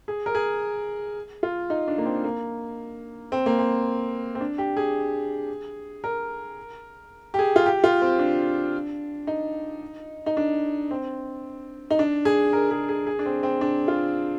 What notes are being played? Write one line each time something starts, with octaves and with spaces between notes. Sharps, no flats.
G#4
A#4
G#4
F4
D#4
D4
A#3
C4
A#3
C4
A#3
C4
C4
D4
G4
G#4
A#4
G4
G#4
F4
G4
F4
C4
D4
D#4
D#4
D4
C4
D#4
D4
G#4
A#4
G#4
G#4
G#4
D4
C4
C4
D4
F4